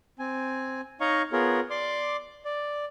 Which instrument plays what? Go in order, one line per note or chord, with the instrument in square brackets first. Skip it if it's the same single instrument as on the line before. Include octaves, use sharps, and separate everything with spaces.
[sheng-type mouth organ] C4 G#5
D#4 C#5 D#5 F5 A#5 C#6
B3 F4 G#4 A#4 C#5
D5 C6 D6
D5